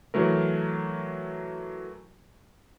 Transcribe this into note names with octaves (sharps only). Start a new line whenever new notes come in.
E3 F#3 A3 A#4